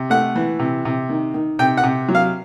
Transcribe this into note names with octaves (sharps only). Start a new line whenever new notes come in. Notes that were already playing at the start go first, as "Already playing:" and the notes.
Already playing: C3
A3 F#5
E3
C3
C3
D#3
D#3
C3 G5
F#5
C3
F#3
F5